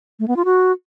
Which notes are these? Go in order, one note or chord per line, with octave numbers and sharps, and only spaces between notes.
A3
B3
F4
F#4